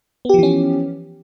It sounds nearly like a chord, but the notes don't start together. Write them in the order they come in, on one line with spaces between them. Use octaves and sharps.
B3 G4 F3 E3 C#4